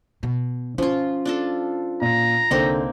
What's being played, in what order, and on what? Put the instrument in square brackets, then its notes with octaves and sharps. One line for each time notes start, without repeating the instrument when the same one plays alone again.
[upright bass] B2
[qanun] F3 F4 [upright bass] C#4
[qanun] D4 F4 A4
[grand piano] A#2 [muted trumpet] A#5
[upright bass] C2 [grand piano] D3 [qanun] A#3 C4 D#4